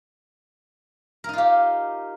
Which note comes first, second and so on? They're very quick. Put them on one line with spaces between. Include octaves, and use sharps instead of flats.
A#4 D#4 F4 G4